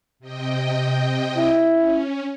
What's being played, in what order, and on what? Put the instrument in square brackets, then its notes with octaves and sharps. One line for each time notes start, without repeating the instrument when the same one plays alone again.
[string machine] C3 D#5 G5
[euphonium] E4
[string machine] C#4